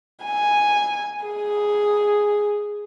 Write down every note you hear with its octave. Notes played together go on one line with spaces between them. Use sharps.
G#5
G#4